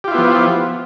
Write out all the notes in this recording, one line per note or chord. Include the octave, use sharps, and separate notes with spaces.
F3 B3 E4 F4 G4